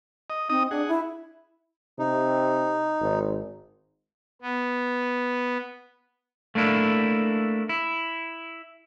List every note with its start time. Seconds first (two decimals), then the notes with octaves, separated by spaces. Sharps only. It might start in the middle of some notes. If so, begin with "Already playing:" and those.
0.30 D#5
0.50 C4 D#4 D#5 D#6
0.71 D4 G#4 F#5
0.88 E4
1.99 C3 D#4
3.01 G#1
4.42 B3
6.55 A3 A#3 D4 E4
7.69 E4